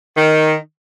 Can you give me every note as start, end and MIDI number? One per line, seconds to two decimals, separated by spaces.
0.16 0.56 51